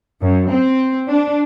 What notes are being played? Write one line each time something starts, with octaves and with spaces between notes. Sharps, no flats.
F#2
C4
D4